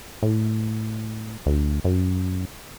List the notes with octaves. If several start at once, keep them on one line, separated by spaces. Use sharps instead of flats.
A2
D2
F#2